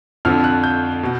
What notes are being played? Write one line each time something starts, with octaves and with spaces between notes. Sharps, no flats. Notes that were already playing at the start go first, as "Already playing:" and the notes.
F2 D3 F3 F6
F#6
G6
B2